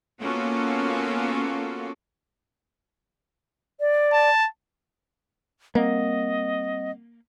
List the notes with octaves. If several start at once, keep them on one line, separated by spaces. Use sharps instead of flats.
A#3 B3 C#4 F4 F#4 A4
D5
A5
G3 A#3 C4 D#5 F#5